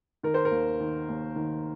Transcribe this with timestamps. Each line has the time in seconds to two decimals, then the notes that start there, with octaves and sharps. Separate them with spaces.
0.23 D#3 A#4
0.34 C5
0.45 A#4
0.51 D#2
0.80 D#3
1.09 D#2
1.36 D#3